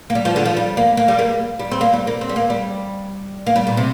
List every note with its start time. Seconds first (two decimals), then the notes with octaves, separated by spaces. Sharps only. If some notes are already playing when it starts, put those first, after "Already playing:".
0.10 A#3
0.15 G3
0.25 F3
0.36 D3
0.46 F3
0.57 G3
0.77 A#3
0.97 A#3
1.08 G3
1.19 A#3
1.59 G3
1.71 C4
1.81 A#3
1.93 G3
2.07 A#3
2.21 C4
2.29 G3
2.36 A#3
2.50 G3
3.46 A#3
3.56 G3
3.67 A#2
3.77 C3